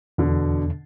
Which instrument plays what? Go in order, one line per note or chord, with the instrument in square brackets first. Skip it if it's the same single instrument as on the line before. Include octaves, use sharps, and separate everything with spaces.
[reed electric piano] E2 [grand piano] B2 D3